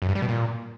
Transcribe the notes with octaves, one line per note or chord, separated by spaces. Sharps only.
F#2
G2
G3
B2
A#2